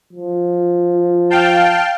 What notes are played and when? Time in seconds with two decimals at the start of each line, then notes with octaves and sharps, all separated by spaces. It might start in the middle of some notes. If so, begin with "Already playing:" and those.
0.13 F3
1.30 F5 G5 A5